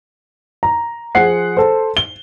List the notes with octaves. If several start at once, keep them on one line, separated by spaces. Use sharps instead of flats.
A#5
F3 G#4 C5 F#5 C7
A4 C5
G7